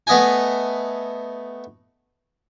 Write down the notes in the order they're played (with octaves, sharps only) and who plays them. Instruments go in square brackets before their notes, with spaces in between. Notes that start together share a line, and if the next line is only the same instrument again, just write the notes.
[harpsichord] A3 B3 D#5 G5 G#5